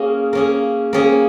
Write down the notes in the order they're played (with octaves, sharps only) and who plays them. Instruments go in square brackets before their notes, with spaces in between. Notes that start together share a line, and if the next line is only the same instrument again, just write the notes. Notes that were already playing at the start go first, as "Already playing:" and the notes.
Already playing: [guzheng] A#3 C#4 G#4
A#3 C#4 G#4
A#3 C#4 G#4